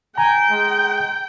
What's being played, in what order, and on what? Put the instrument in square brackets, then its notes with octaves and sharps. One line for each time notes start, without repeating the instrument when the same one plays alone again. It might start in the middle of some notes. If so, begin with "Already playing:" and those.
[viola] G5 [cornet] G#5 [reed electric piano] A#5
[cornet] G#3